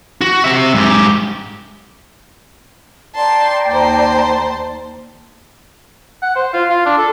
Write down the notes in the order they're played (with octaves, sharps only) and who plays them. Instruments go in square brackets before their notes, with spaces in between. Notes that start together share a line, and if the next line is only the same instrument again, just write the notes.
[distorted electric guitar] F#4
C3 E5
G#2 G4
[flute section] D5 G5 A#5 [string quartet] A5 C6
[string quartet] D#2 C5 A5
[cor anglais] F#5
C5
F4
F4
D4
A4